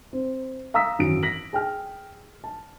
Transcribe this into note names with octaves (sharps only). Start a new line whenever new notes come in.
C4
F5 A#5 D#6 E6 B6
G#1 F#2 E3 F#3 D7
A#6 B6 F#7
G#4 G5 F6
A5